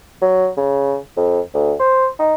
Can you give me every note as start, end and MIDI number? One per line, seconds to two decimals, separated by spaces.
0.22 0.50 54
0.57 0.97 49
1.16 1.40 41
1.54 1.73 38
1.80 2.06 72
2.19 2.35 63